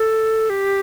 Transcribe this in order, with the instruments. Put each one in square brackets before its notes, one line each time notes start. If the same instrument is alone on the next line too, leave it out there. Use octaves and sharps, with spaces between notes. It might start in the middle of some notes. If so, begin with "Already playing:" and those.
Already playing: [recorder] A4
G4